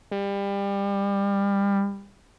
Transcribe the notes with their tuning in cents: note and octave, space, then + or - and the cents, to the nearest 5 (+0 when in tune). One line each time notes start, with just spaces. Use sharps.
G3 +25